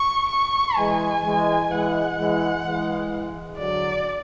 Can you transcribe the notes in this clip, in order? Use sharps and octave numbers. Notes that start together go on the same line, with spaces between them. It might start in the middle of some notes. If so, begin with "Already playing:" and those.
Already playing: C#6
C#6
E3 G#3 G#5
E3 G#3
E3 G#3 F#5
E3 G#3
E3 G#3
D3 F#3 D5